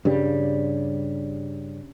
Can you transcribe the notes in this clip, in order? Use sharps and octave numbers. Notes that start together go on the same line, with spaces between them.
G2 C#3 G3